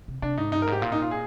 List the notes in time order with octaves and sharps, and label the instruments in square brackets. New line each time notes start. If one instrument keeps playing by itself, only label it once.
[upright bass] C3
[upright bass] C3 [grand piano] D4
[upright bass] G#2 [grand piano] D#4
[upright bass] G2 [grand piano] D#4
[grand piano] A#4
[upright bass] G#2 [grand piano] G4
[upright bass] A#2 [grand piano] F4
[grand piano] D#4
F4
G#4